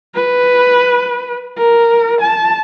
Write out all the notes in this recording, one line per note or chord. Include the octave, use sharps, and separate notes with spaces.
B4
A#4
A5